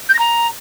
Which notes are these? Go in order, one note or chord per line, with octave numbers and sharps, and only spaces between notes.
G6
A#6
A#5